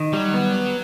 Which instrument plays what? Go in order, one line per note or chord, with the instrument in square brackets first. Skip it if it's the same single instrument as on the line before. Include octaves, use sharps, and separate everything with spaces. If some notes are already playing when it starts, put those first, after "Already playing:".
Already playing: [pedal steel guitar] D#3
[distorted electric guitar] F#3 [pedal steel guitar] G3
[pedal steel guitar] B3